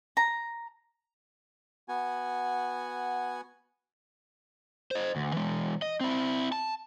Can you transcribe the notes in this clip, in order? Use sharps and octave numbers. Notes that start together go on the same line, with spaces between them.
A#5
B3 F#4 G#5
C5 D#5
D2
E3 G#3
D#5
C4 E4
A5